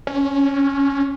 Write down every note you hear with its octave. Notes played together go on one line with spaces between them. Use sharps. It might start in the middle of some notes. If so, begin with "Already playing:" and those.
C#4